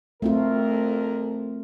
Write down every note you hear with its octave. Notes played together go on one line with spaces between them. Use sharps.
F2 F3 A3 C4 F4 A#4